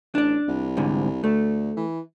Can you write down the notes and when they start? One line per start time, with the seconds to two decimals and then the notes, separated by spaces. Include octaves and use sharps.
0.15 A1 D4 D5
0.48 C2
0.77 G#2 D3
1.24 D2 A3
1.77 E3